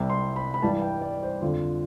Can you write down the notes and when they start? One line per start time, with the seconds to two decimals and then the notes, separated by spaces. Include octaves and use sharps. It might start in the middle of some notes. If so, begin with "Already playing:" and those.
Already playing: C2 C3 G3
0.10 C6
0.36 B5
0.54 B5
0.62 G2 E3 G3 A5
0.82 G5
1.02 D5
1.23 C5
1.42 F2 D3 F3 F4